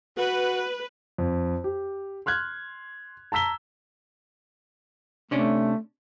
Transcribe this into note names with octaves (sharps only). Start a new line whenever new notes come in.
F#4 B4
F2
G4
C6 F6 F#6 G#6
A5 A#5 E6 B6 G7
C3 A3 C#4 D4